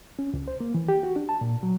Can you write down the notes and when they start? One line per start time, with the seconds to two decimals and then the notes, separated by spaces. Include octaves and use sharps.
0.19 C#4
0.34 C#2
0.48 C5
0.60 A#3
0.74 E3
0.88 G4
1.03 F#4
1.16 D4
1.29 A5
1.41 A#2
1.63 F#3